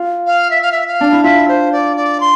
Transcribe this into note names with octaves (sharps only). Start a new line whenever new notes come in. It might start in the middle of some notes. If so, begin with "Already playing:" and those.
Already playing: F4
F5
E5
F5
E5
F5
D4
E4
F4 E5
C5
D5
D5
C6